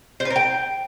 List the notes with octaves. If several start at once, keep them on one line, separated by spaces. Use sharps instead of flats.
C5
B4
A#4
G5